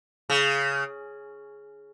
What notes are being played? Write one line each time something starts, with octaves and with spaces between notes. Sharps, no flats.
C#3